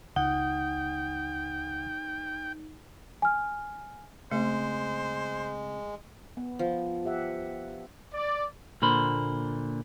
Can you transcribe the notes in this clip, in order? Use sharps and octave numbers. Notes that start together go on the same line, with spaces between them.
C#2 D#4 F#5 G5
G#5 F6
C#3 G#3 A3 C4 C5
B3
F3
G4 E5 F#5
D5
A#2 D3 A#3 C5 B5